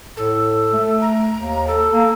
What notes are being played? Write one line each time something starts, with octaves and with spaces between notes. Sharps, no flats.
A2 A4
A3
A#5
D#2
A4
A#3